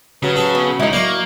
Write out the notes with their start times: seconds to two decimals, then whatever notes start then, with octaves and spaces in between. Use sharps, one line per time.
0.23 C#3 F#3 B4
0.36 F#3 A4
0.55 B3
0.80 C#2 D#4 E4 D#5
0.93 F#3 A#3 D5 C#6